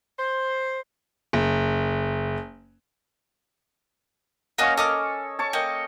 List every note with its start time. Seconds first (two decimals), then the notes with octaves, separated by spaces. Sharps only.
0.18 C5
1.33 F#1
4.58 A#3 C#4 F#4 D#5 F5 C#6
4.77 A4 D#5 D6 F6
5.39 C#5 A5 C#6
5.53 A#3 D#5 G5